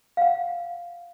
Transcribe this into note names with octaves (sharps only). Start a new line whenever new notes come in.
F5 F#5